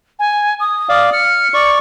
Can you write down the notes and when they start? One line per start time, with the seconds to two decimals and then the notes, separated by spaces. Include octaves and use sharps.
0.19 G#5
0.60 D#6
0.89 D5 F5
1.13 F6 C#7
1.54 D5 C#6